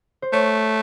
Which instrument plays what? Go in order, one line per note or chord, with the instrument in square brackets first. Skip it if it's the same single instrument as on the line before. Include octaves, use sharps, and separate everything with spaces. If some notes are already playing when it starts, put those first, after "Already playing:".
[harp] C5
[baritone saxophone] A3 [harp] C#5